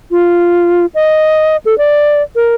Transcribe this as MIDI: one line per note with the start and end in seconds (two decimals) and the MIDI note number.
0.11 0.86 65
0.95 1.57 75
1.65 1.77 69
1.78 2.22 74
2.36 2.55 70